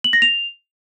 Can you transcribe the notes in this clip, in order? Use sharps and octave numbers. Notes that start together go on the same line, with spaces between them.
F#7
A#6
F7